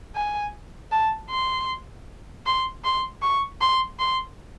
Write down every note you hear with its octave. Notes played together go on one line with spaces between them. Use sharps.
G#5
A5
C6
C6
C6
C#6
C6
C6